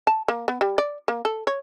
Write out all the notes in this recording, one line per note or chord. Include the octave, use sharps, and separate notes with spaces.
A5
A#3
B3
G3
D5
A#3
A4
C#5